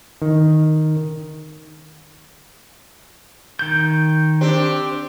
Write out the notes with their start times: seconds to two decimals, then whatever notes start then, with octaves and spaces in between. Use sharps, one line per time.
0.22 D#3
3.59 D#3 G6
4.41 C4 D4 G4